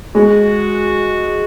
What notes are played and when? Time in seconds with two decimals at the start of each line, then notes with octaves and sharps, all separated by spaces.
0.15 G#3 F#4